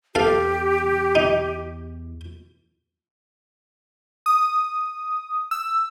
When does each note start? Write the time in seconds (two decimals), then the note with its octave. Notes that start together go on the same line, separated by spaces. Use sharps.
0.15 E2 G4 A4 F5
1.15 D#4
4.26 D#6
5.51 E6